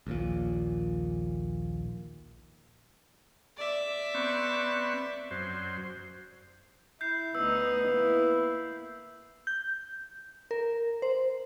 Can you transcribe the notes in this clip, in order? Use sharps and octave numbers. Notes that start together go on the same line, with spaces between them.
A#1 D#2 A#2
D5 E5
B3 C4 C#6
F#2 C5
E4 G6 C7
D2 B3 D#4 E6
A#3 E4
G6
A#4
C5